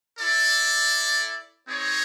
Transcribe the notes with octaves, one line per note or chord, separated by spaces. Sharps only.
E4 A4 D5
C4 D#4 G#4 C#5